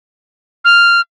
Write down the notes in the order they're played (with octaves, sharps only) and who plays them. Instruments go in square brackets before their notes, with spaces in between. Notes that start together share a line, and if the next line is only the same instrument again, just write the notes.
[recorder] F6